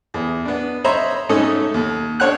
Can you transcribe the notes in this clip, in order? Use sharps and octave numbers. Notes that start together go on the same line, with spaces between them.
E2
B3 D4
C5 C#5 D#5 E5 A#5 B5
G#2 A3 C#4 D#4 A4 D#6
D#2
D4 A4 C#5 F#5 F#6